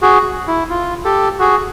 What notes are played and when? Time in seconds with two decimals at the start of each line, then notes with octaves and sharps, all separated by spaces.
0.02 F#4 G#4
0.48 E4
0.70 F4
1.05 G4 A4
1.39 F#4 G#4